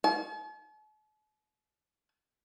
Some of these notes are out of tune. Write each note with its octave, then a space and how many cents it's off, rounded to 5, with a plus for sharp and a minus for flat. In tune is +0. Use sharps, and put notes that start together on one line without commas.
A5 -45